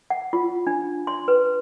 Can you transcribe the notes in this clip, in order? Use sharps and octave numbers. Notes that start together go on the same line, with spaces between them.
F#5
F4
D4
C6
B4